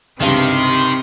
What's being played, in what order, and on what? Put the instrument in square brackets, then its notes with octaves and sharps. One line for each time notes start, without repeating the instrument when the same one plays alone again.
[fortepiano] C#2 G2 [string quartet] C3 [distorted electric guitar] D#3 [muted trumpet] C6